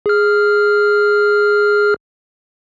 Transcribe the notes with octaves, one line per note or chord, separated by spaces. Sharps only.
G#4 F6